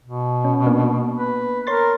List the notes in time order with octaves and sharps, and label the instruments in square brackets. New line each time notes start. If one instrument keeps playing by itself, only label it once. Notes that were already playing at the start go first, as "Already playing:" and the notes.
[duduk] B2
[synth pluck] C#4
A#3 B3 D4
[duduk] B4
[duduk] A#4 [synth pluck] C#5 C6 A6